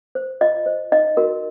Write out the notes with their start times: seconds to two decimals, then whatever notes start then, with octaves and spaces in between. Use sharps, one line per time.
0.15 C5
0.41 F4 D#5
0.66 C5
0.92 D#4 D#5
1.17 F#4 A#4